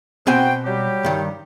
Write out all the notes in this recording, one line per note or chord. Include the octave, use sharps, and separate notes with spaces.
B2 C4 F#4 C5 G5 G#5
F#3 G3 G4
G2 D#3